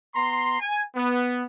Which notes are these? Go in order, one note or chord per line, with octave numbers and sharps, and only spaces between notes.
B3 A#5 C6
G#5
B3